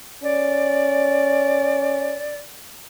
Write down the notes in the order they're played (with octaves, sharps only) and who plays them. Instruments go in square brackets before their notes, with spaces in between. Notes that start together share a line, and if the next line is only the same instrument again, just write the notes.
[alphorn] C#4 [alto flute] D5